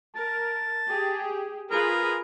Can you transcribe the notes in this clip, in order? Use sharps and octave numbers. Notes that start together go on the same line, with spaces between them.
A#4 A5
G4 G#4
F4 G#4 A#4 B4